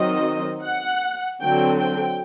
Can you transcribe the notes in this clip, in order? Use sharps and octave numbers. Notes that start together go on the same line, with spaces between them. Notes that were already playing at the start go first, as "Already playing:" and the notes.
Already playing: D#3 F#3 C4 D#5
F#5
D3 F#3 C4 G5
G5